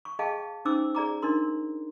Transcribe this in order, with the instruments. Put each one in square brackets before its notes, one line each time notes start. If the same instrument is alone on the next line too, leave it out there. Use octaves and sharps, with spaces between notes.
[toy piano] C#6
G#4 D#5 F5 G5 A5
C#4 D#4 C5 D6 E6
G#4 D5 A#5 D6
D4 D#4 A#4 C6